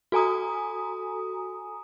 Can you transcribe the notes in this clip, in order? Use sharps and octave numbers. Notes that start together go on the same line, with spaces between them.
F#4 A4 G#5 A#5 D#6